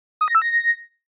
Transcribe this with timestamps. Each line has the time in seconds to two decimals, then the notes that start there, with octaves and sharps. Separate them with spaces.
0.21 D#6
0.28 A#6
0.35 E6
0.42 A#6